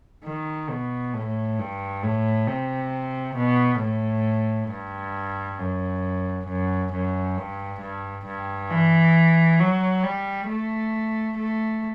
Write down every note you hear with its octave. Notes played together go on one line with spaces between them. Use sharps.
D#3
B2
A2
G2
A2
C3
B2
A2
G2
F#2
F#2
F#2
G2
G2
G2
E3
F#3
G3
A3
A3